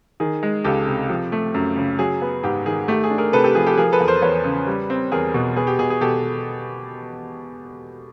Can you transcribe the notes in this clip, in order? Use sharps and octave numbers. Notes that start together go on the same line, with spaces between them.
D#3 G#4
G#3
C#2 G4 A4
C3
F3
A3
F#2
C#3
F#3 G#4
B3
G#2 G4
D#3 G#4
A3 G4
G#4
D4
G#4 A#4
C3 A4 B4
G4 A4
F3 G#4
G4 A4
F3 G#4 A#4
A4 B4
E2
A#4 C5
E2 B4 C#5
C#3
G3
C4
E2 G#4 A#4
B2
B3 G#4
G4
B2 G#4
G#4
B2 G4 A4